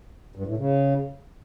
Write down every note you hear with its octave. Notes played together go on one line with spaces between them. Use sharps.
G2
A2
C#3